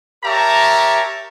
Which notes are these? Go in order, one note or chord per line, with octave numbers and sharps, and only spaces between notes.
G4 A#4 C#5 E5 A5 A#5